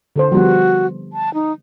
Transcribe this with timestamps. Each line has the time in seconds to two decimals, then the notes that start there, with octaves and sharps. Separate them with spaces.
0.16 D3 A4 C5
0.32 F3 G3 B3 F#4
1.13 A5
1.34 D#4